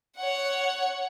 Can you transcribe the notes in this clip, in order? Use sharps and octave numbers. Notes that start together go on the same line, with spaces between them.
C#5 F#5